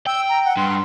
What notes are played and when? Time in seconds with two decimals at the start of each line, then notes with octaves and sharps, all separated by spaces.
0.07 G5 E6
0.29 A#5
0.44 F#5
0.57 G2 C6